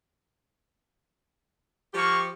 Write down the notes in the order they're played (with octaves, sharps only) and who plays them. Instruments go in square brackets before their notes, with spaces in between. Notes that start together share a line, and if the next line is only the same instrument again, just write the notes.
[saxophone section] F3 G4 [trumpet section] A#3 C#6